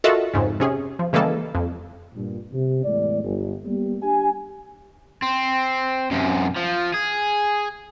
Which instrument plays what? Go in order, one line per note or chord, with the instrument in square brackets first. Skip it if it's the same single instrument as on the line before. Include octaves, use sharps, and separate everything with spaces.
[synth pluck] F4 F#4 A4 A#4 D#5 E5
F2 G#2 C#3
C3 C#4 G#4
F3
C#3 E3 G3 G#3 A#3 A4
F2
[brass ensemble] G2 A#2
C3
E2 A2 G#3 D5
G1
G3 A#3 B3 G4
D4 G4 G#5
[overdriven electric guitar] C4
F#2 C3
F3
G#4